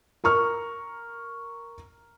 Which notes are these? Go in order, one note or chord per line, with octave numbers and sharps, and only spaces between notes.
A#4 A#5 C#6 F6